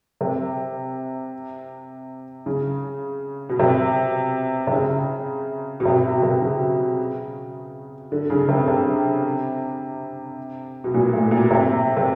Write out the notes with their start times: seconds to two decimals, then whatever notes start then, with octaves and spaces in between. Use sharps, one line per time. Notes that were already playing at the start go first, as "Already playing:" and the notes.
0.21 C3
2.46 C#3
3.49 B2
3.59 C3
4.67 C3
4.73 C#3
5.80 B2
5.85 C3
6.04 B2
6.23 C3
6.42 C#3
8.12 D3
8.30 C#3
8.49 C3
8.68 C3
10.84 B2
10.94 A#2
11.13 A2
11.31 A#2
11.51 C3
11.97 C3